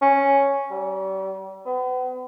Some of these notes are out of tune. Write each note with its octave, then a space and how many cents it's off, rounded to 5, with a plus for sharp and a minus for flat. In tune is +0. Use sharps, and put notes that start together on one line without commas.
C#4 +0
G3 -35
B3 +40